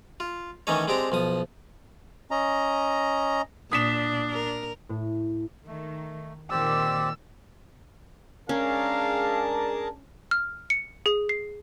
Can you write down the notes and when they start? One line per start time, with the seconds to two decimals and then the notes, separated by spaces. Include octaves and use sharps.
0.20 F4
0.67 D#3 E3 A3 C#4 D#4 C#5
0.88 G#3 C4 D4 G4 A#5
1.12 B1 F3 D#6
2.31 C#4 D#5 A#5
3.71 A#2 D4 D#6 B6 E7
4.31 A#4
4.89 A2
5.67 D#3 A3
6.51 A#2 D#3 C4 G4 D5 E6
8.49 G#3 C#4 D4 G#4 A#4 F5 A5
10.31 F6
10.70 C#7
11.06 G#4
11.29 C7